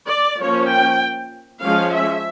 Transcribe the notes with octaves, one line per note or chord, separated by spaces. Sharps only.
D5
F3 A#3 C#4 C#5
G5
F3 G#3 C#4 F5
E5